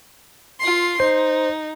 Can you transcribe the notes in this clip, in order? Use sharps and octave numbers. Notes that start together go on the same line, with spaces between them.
F4 C6
D#4 C5